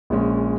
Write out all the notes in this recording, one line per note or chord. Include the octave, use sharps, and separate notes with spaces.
A#1 A#2 G#3 C#4